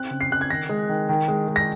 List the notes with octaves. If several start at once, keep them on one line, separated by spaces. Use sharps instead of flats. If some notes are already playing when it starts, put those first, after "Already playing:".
Already playing: C4 F#6
C#3
C7
C#3 F#6
G#6
D#3 A#6
G#3
D#3
D#3
G#3
G#3
A#6